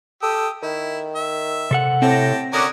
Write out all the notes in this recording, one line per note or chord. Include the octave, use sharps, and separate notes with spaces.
G4 A4 D#6 E6
D#3 E4
E5
C3 A4 F#5
A2 C4 G4 A5 A#6
D3 C#4 F#4 A#4 D6 D#6 F#6